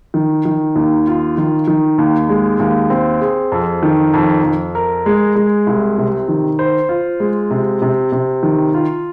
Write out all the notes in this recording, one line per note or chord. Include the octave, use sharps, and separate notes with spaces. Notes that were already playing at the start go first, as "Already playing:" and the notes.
D#3
D#3
D#2
F4
D#3
D#3
D#2
G#3
D#2
C4
G#4
F2
D#3
F2
F2
A#4
G#3
G#3
C2
C3
D#3
C5
F4
G#3
C3
C3
C3
D#3
F4